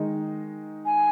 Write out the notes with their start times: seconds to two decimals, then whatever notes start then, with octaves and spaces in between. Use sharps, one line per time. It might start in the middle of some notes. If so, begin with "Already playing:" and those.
Already playing: D#3 G#3 D#4
0.86 G#5